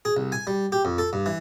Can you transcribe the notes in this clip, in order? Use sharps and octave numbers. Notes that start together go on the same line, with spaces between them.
G#4
C2
G#5
G3
G4
F2
A4
G2
E3